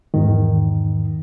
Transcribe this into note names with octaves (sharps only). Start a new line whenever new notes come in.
E2 G#2 D#3